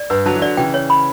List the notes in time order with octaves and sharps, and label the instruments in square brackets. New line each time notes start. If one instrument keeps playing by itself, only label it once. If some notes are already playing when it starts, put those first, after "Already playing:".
Already playing: [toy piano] D5
[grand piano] G2 [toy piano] B4
[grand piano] D3 F#3 [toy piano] A5
[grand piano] E3
[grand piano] D3 F#3 [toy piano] D5
[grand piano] C#3 E3 [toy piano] G5
[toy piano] C#5
B5